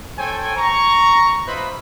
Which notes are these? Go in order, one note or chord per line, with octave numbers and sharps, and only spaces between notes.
A4 C5 C#5 G5 G#5
A#5 C#6
F4 B4 C5 D#5 E5 B5